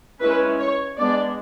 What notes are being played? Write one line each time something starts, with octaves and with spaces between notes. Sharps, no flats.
G#3 C#4 E4 B4
C#5
G#3 B3 D4 D5